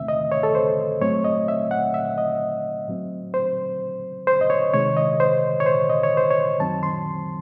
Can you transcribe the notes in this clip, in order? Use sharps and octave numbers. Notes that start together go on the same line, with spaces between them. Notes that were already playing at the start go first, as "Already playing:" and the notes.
Already playing: E2 C3 D#3 A3 C4 E5
D#5
C#5
A4
C5
G#2 F#3 A3 C4 C#5
D#5
E5
F#5
E5
D#5
A2 F#3 C4
C5
C5
D#5
C#5
C3 D#3 G#3 C#5
D#5
C5
C#5
C5
D#5
C#5
C5
C#5
F#2 D#3 F#3 C4 A5
C6